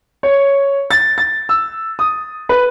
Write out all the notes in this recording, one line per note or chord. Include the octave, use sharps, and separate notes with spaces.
C#5
A6
A6
E6
D#6
B4